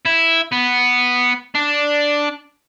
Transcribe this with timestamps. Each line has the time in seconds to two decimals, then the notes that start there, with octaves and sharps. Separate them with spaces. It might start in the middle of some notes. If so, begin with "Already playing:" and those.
0.06 E4
0.52 B3
1.55 D4